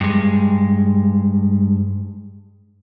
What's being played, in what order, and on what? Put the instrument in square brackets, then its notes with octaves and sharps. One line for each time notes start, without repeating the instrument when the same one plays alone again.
[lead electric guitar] G2 G#3